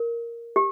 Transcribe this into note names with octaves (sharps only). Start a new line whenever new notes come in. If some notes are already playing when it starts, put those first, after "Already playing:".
Already playing: A#4
G4